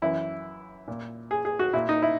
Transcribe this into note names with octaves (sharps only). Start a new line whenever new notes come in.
F#2 E3 E4
A#2
G#4
G#4
F#4
A#2 E4
D#4
E4